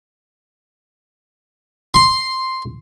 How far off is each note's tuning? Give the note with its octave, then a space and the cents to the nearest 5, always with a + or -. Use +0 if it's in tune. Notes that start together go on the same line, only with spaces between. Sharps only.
C6 +0